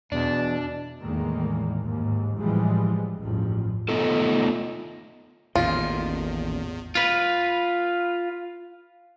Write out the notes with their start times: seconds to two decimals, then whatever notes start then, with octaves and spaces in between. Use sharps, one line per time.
0.12 E2 B2 D4
1.00 E2 A2 D#3 G#3 A#3
1.81 D#2 G#2
2.39 A2 E3 F3 G3 G#3
3.20 A1 E2 G2 F3
3.89 A3 B3 D#4 F4 A4
5.55 A1 E2 A#2 D#3 F4
6.95 F4 B4